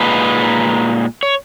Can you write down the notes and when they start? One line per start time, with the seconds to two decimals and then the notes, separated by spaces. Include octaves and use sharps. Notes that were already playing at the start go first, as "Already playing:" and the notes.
Already playing: A#2 G#3 D#4 B4
1.23 C#5